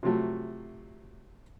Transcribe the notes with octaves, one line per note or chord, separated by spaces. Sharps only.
C3 F3 F#3 A3